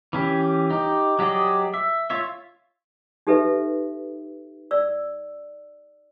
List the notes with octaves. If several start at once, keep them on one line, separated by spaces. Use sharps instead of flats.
E3 C#4 G4
D#4 G4
F#3 G4 G#4 D5 D#5
E5
F4 C#5 E5
D#4 G4 A4 B4 E5
D5 E6